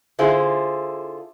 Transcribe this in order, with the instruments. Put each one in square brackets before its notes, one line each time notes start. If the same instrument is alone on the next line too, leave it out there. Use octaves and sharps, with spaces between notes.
[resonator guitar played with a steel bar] D3 E4 F4 G#4 C5